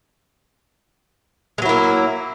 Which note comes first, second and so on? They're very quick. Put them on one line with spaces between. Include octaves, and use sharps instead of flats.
G#3 F#3 E4 A#3